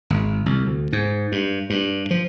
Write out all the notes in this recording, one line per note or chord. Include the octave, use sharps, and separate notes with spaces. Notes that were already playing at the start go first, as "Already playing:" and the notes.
G#1
C2
D2
G#2
G2
G2
F3